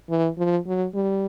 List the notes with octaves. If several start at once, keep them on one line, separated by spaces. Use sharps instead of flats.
E3
F3
F#3
G3